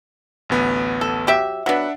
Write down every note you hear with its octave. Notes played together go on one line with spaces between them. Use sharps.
A1 D2 B3
A4
F#3 G4 E5
F#3 B3 D4 E5 F#5